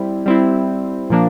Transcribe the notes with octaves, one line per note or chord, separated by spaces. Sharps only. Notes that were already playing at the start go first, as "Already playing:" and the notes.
Already playing: G3 C4 E4
G3 C4 E4
A#2 F3 A#3 D4